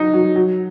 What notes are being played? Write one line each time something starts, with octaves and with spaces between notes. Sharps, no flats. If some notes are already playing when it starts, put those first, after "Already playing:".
Already playing: F#3 D#4
F#3
F#3